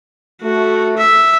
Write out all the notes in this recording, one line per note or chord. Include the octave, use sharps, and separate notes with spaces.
A3 F#4
E5